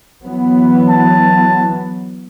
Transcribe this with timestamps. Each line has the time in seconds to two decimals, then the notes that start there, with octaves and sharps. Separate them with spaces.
0.23 E3 F#3 B3
0.89 A5